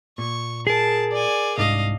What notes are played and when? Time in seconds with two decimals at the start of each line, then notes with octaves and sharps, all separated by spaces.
0.18 A#2 C#6
0.67 G#4 A#4 A5
1.12 D5 G#5
1.58 C2 G#2 D4 D#5 F5